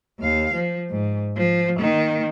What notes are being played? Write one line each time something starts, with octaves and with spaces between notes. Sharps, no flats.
D#2 F5
F3
G#2
F3
D#3 A#3